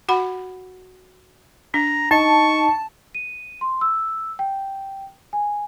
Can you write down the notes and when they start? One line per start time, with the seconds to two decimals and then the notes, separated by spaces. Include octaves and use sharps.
0.09 F#4 F#5 B5
1.74 D4 A#5
2.11 D#4 D#5 A5 C#6
3.15 D#7
3.61 C6
3.81 E6
4.39 G5
5.33 G#5